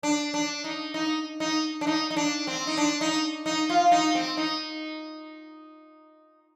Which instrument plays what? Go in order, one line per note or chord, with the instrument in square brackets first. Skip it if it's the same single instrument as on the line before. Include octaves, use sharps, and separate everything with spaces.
[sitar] D4
D4
D#4
D#4
D#4
D4
D#4
D#4
D4
C4
D#4
D4
D#4
D#4
F4
D#4
C4
D#4